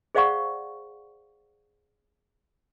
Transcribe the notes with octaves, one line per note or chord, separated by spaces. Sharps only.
G#4 C5 D5 F5 F#5 C#6